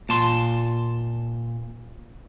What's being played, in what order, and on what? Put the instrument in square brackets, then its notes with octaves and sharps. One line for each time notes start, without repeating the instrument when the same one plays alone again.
[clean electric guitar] A#2 A5 C6